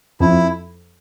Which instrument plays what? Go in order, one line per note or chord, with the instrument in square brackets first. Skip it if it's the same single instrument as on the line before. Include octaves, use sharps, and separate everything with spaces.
[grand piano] F2 [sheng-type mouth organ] E4